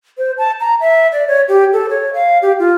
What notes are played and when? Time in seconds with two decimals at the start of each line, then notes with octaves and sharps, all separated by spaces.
0.18 C5
0.38 A5
0.60 A#5
0.80 E5
1.12 D5
1.28 C#5
1.48 G4
1.73 A4
1.89 C#5
2.14 F5
2.42 G4
2.59 F4